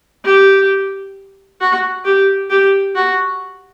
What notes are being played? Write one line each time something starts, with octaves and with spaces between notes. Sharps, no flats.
G4
F#4
G4
G4
F#4